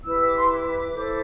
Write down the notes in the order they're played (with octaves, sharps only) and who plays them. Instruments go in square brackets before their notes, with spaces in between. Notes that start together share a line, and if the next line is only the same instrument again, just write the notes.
[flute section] E4 G4 B4 E6
D6
C6
D6
E4 A4 C5